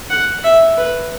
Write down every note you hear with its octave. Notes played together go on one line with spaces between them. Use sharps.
F#5
E5
B4